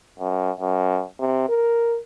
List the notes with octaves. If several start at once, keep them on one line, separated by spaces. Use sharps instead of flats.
F#2
F#2
C3
A#4